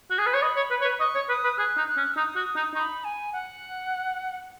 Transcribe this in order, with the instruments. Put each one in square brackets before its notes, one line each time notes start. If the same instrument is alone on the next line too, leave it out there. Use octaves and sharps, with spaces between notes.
[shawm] F#4
G#4
B4
C#5
[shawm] D#5 [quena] B5
[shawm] C#5
B4
C#5
B4
[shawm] D#5 [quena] C#6
[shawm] C#5
[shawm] B4 [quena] D#6
[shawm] B4
[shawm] G#4 [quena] F#6
[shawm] D#4
[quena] F#6
[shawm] C#4
[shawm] D#4 [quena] D#6
[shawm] F#4
D#4
[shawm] D#4 [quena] C#6
[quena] B5
G#5
F#5